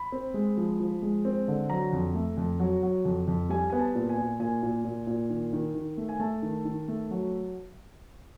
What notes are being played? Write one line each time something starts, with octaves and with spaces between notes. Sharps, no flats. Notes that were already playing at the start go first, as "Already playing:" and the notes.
Already playing: B5
C4
G#3
F3
F3
G#3
C4
D3
F#3 A#5
F2
A3
F2
F#3
F#3
F2
F2
G3 G#5
B3 G#5
A5
A#2
G#5
A#2
A#2 G#5
A#2
A#2
A#2
D#3
D#3
D#3
A3
G#5
A3 A5
D#3
D#3
A3
F#3